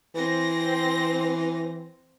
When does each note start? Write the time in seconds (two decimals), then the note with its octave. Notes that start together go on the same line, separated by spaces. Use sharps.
0.15 E3 C4 A#6